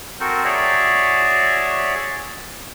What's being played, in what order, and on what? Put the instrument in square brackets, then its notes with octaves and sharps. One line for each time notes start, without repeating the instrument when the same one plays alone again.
[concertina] C4 F#4 A4 A#4 C5
F#4 G#4 C#5 D5 E5